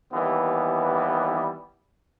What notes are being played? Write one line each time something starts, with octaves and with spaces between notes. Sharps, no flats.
D#2 E3 G3 B3